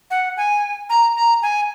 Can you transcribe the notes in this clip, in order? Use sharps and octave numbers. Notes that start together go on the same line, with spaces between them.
F#5
G#5
A#5
A#5
G#5